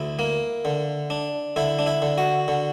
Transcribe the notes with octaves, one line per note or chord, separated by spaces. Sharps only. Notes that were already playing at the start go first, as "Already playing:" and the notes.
Already playing: D2 E4
A#3
D3
D4
D3 E4
D4
E4
D3
F#4
D3